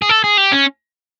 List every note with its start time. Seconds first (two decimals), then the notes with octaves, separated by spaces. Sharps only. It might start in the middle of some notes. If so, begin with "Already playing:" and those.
0.02 G#4
0.09 A4
0.24 G#4
0.38 G4
0.52 C#4